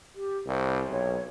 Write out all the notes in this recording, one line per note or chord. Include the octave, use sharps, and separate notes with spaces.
G4
C2 C5
B1 C#5